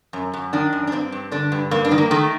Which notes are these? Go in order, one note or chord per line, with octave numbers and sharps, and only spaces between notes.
F#2
F#2
D#3 D4
F#2
D4
G2 C4
G2
D3 D4
G2
G2 A#3
D4
D#3
A#3
D#3 A3